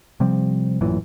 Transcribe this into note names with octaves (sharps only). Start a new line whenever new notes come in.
C3 F3 G3 C4
A1 F#2 A#2 E3